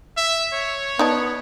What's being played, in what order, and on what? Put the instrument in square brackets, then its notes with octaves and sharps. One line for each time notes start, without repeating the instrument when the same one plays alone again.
[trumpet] E5
C#5
[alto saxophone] B3 [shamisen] D#4 D5 A5